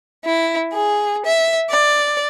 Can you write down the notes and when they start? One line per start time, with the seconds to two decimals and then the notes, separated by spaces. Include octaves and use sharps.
0.25 E4
0.73 G#4
1.25 E5
1.69 D5